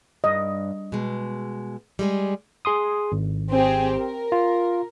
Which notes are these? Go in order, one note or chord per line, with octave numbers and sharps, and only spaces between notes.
G2 D#5
B2 G#3
G3 G#3 G#4
G#4 C6 D#6
G#1
C4 G4 G#4
A#4
F4